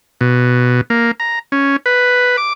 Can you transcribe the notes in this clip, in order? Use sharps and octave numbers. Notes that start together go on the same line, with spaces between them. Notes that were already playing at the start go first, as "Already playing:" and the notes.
B2
A#3
A#5
C#4
B4
D6